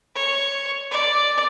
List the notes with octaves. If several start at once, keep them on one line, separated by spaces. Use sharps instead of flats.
C#5
D5